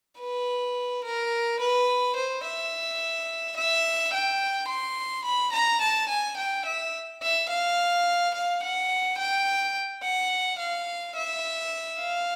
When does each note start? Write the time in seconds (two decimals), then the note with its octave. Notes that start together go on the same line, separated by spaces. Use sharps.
0.19 B4
1.04 A#4
1.60 B4
2.16 C5
2.44 E5
3.57 E5
4.14 G5
4.69 C6
5.25 B5
5.53 A#5
5.81 A5
6.10 G#5
6.37 G5
6.66 E5
7.23 E5
7.50 F5
8.35 F5
8.63 F#5
9.18 G5
10.03 F#5
10.59 F5
11.16 E5
12.00 F5